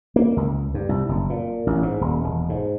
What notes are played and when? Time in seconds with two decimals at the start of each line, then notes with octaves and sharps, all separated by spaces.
0.16 A#3
0.37 C#2
0.74 G2
0.89 C2
1.09 F#1
1.30 A#2
1.67 A1
1.83 G#2
2.01 D#1
2.24 E1
2.49 G#2